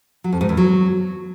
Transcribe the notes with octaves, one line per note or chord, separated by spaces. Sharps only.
F#3
F2
G#2
E2
F#3